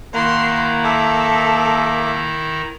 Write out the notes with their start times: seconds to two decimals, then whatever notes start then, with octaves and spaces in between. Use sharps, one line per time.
0.14 D#3 A#3 E4 F#5 A#5 C6
0.84 A4 E5 D6